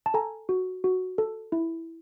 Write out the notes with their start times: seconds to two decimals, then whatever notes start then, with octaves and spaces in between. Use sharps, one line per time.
0.06 A5
0.14 A4 G#5 A#5
0.49 F#4
0.84 F#4
1.18 A4
1.52 E4